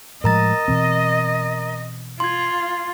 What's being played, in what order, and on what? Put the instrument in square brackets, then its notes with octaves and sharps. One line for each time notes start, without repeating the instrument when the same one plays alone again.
[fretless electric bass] A2 F3 G#3 [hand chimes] A#4 A#5 A6 [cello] D#5
[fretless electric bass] B2 E3 C4
[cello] F4 [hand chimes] C6 G#6